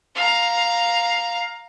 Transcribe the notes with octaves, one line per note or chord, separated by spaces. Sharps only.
F5 A#5